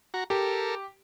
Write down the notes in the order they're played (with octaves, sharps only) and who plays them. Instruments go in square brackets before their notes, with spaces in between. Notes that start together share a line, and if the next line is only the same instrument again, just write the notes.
[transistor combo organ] F#4 A#5
[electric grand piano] G4 [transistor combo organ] A4 A#4